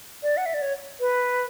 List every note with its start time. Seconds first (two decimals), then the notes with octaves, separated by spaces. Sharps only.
0.23 D5
0.37 F#5
0.46 E5
0.54 D5
0.62 C#5
1.00 B4